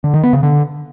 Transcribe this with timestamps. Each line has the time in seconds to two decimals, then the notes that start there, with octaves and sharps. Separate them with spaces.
0.04 D3
0.14 D#3
0.23 B3
0.33 C#3
0.43 D3